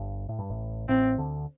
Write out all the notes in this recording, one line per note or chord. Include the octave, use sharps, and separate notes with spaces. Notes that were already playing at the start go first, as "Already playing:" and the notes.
Already playing: G1 G2
A2
G2
A1 A2
A1 A2 C4
D2 D3